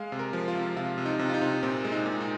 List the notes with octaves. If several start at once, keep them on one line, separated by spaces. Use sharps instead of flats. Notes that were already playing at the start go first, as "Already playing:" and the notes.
Already playing: G#3 F5
C3
A#4
F3
F4
C3
C3 F4
C3
D#4
C3
F4
D#4
C3
D#4
A#2 C4
G#3
D#4
A#2
D#4